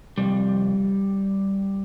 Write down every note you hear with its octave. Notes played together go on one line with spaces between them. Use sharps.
F2 C3 G3